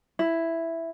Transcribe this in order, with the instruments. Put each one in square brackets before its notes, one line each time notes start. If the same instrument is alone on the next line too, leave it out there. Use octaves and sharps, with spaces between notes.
[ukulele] E4